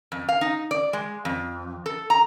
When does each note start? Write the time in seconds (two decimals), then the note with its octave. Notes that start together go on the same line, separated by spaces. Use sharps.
0.12 F2
0.29 F5
0.41 D#4
0.71 D5
0.93 G#3
1.25 F2
1.86 A4
2.10 A#5